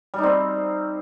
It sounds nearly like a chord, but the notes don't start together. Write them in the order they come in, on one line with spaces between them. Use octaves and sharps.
G3 D#4 C4